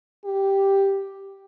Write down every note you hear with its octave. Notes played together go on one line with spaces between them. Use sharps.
G4